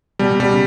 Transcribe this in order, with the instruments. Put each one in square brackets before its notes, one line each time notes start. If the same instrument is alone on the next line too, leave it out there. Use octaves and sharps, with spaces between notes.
[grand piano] B2 [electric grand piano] G3
[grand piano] A#2
[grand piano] B2 [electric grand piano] G3
[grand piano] C#3